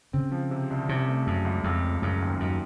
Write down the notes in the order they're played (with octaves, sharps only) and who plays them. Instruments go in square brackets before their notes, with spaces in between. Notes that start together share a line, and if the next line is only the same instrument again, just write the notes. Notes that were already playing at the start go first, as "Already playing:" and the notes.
[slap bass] C#3 [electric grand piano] C4
[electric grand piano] F3
C3
C2
[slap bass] C3 [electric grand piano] C#4
[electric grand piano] A3
[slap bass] F#2 [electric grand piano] C#3
[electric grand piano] C#2
[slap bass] F2 [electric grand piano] A3
[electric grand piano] F3
[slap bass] F#2 [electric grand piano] C#3
[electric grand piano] D#2
[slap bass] F#2 [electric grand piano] D#4